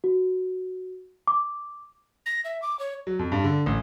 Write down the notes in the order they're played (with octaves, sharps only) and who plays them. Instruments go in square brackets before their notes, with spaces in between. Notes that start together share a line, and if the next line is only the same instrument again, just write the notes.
[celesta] F#4
D6
[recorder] A#6
E5
D6
C#5
[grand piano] F#3
F2
G2
D3
A1